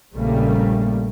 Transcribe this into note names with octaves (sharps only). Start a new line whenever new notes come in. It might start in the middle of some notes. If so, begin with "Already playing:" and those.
A#1 C#3 G3 A3 A#3